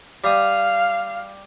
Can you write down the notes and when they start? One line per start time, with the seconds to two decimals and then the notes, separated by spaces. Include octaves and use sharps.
0.24 G3 F5 D#6